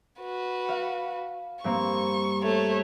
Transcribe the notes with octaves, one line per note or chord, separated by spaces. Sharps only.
F#4 B4
F5
G2 A#3 C4 C#6
A3 C#5